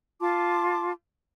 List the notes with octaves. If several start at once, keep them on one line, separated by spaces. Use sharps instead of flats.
F4 A5 C6 D6